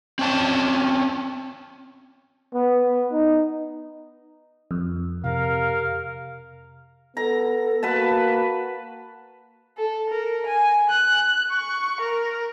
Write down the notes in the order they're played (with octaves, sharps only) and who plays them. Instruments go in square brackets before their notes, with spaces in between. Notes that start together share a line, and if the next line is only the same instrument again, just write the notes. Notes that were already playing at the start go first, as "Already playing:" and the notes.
[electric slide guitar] C4 C#4 G#5 A5
[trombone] B3
D#4
[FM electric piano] F2
[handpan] C3 [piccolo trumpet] A#4 [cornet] F5
[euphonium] B3 [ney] A4 [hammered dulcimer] A#5
[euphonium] A#3 [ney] F#4 [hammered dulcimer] B4 F#5 A5
[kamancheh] A4
A#4
G#5
F#6
C#6
A#4